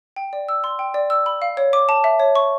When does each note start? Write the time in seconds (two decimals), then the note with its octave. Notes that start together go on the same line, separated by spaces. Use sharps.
0.16 G5
0.33 D5
0.49 E6
0.64 C6
0.79 G5
0.94 D5
1.10 E6
1.26 B5
1.42 F5
1.57 C#5
1.73 D6
1.89 A5
2.04 E5
2.20 C#5
2.35 C#6